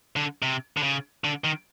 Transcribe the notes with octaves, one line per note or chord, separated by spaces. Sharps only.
D3
C3
D3
C#3
D3
D#3